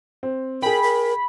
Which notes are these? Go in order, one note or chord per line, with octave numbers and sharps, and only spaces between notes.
C4
G#4 A#4 G5 B5
A#4